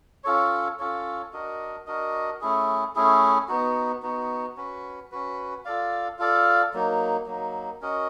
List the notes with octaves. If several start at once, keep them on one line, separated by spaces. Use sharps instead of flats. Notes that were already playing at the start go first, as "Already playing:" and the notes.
C#4 F4 A4 C#5
C#4 F4 A4 C#5
D4 F#4 A#4 D#5
D4 F#4 A#4 D#5
A3 C#4 E4 G#4
A3 C#4 E4 G#4
B3 D#4 F#4
B3 D#4 F#4
C#4 F#4 B4
C#4 F#4 B4
F4 A4 D5 F5
F4 A4 D5 F5
F#3 A#3 D#4
F#3 A#3 D#4
C#4 F#4 A#4 D#5